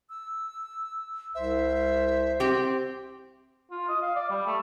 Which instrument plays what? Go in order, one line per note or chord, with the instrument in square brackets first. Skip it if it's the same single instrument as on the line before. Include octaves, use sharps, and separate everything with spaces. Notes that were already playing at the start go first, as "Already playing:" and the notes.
[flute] E6
[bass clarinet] C2 [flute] C5 [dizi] E5
[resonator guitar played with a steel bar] C4 G4 [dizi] G5
[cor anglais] F4
D#5
F5
D5
G3
A3